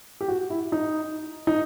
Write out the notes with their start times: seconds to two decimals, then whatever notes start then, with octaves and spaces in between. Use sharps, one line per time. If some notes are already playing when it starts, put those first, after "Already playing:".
0.21 G4
0.28 F#4
0.50 E4
0.72 D#4
1.47 D#4